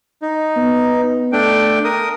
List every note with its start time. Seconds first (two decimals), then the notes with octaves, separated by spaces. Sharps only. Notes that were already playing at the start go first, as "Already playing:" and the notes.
0.22 D#4
0.57 B3
1.32 A3 D4 G5
1.84 A#4 D#6